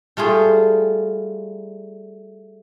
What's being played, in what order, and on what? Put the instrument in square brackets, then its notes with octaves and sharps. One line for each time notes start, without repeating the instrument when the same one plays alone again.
[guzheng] G3 A3 F4 G#4